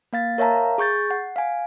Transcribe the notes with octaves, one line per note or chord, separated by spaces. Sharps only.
A#3 F5 A6
A#4 C#5 E5 F5 A5 A#5
G#4 C#6 G6 A6
F#5
F5 G#5